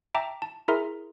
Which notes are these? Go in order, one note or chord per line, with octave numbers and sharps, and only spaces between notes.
E5 G5 A5 A#5 D6
A5
E4 G#4 A#4 E5 A#5 C6